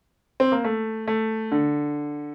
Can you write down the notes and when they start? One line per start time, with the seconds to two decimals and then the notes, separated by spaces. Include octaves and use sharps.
0.40 C4
0.52 A#3
0.64 A3
1.08 A3
1.52 D3